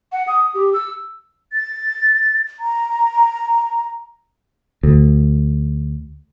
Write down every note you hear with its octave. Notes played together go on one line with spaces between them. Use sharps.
F#5
D#6
G4
E6
A6
A#5
D2